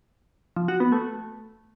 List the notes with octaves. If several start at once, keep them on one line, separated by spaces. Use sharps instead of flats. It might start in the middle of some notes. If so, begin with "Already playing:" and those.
F3
F#4
B3
A3